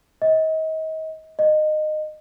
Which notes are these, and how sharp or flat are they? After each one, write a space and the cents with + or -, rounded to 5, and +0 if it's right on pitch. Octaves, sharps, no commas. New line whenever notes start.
D#5 +35
D#5 -20